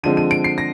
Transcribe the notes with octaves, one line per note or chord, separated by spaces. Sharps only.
D3 F3 G#3 C4 D#7
D#7
D7
C7
A#6